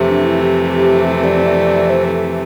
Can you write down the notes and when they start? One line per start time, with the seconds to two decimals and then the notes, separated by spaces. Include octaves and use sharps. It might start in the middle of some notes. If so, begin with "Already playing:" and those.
Already playing: F2 C3 E3 A3
0.09 D4
0.25 E4
0.41 G4
1.24 D5
1.90 C5
2.07 A4